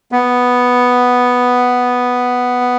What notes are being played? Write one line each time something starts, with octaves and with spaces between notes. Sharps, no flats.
B3